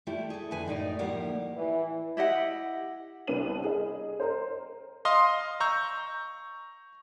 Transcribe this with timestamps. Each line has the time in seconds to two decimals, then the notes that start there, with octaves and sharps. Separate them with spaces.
0.07 G3 A3 E4 F4 G4
0.30 G#4 A4
0.51 F2 D3 A3 B4 G#5
0.66 F#2 A2 D#4 D5 G5
0.99 D2 A2 F3 G3 A#3 F#5
1.54 E3
2.17 E4 G4 D#5 F#5
3.27 C2 B3 D4 C5 D#7 F#7
3.64 G#4 D#5
4.20 A#4 C5
5.05 D#5 F5 C6 D#6
5.60 A#5 C#6 E6 G6